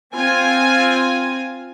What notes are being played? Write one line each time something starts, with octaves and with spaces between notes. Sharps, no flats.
C4 F4 G#5